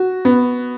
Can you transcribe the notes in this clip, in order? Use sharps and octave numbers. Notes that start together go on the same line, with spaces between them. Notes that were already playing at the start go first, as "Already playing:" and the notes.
Already playing: F#4
B3